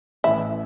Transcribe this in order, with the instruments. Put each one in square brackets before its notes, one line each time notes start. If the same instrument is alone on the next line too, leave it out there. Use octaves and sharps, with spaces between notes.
[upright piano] A1 A2 E3 A3 [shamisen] E4